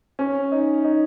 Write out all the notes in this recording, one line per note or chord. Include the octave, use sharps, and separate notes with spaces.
C#4
D#4
D#4